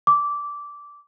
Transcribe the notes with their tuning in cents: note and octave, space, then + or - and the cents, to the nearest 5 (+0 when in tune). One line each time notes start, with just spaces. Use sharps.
D6 -15